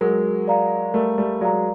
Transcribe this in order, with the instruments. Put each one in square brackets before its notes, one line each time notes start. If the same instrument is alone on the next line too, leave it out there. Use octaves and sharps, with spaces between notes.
[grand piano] F#3 G#3 [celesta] A#4
[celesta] D5 F5 A#5
[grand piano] G3 A3 [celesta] A#4
[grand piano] G3 A3
[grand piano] F#3 G#3 [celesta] D5 F5 A#5